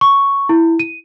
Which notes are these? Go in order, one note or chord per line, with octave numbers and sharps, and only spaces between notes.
C#6
E4
D#7